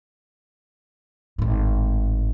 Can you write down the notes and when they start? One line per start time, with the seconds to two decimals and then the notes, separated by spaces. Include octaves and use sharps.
1.38 G#1 A2